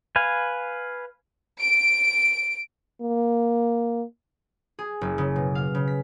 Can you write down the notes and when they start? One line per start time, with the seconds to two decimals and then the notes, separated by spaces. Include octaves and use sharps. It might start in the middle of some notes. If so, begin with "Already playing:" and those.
0.16 B4 F5 G#5
1.60 D7
3.01 A#3
4.79 G#4
5.01 F#1
5.18 C#3
5.36 B2
5.55 F5
5.75 C#3
5.87 B6